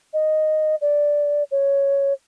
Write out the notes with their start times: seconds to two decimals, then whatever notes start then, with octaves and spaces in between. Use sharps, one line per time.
0.13 D#5
0.81 D5
1.51 C#5